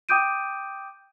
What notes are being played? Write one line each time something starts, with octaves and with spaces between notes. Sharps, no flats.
G5 D6 D#6 G6 D7 D#7